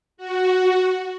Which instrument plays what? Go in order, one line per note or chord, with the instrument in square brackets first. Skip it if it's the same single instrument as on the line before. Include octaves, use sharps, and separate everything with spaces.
[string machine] F#4